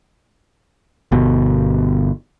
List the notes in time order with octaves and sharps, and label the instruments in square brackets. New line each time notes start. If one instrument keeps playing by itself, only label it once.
[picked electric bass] G1 B2